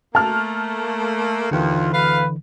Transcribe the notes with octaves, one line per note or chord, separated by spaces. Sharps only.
A3 A#3 A5 F6
D#2 D3 E3 F4
D2 B4 F5